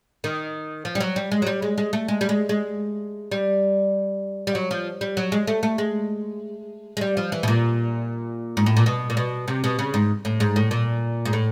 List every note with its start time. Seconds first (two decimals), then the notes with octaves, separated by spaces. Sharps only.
0.24 D#3
0.85 F3
0.95 G3
1.01 F#3
1.16 G3
1.32 G#3
1.42 F#3
1.47 G3
1.62 G#3
1.78 G#3
1.93 A3
2.08 G#3
2.21 G3
2.29 G#3
2.49 G#3
3.31 G3
4.47 G3
4.55 F#3
4.71 F3
5.01 G3
5.17 F#3
5.32 G#3
5.47 A3
5.63 A3
5.78 G#3
6.97 G#3
7.01 G3
7.17 F3
7.32 E3
7.43 B2
7.48 A#2
8.57 G#2
8.66 A2
8.77 A#2
8.86 B2
9.10 A#2
9.17 B2
9.48 C3
9.64 B2
9.79 C#3
9.94 G#2
10.25 A2
10.40 G#2
10.56 A2
10.71 A#2
11.25 G#2
11.33 A2